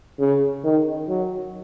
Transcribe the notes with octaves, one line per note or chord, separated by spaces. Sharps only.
C#3
D#3
F#3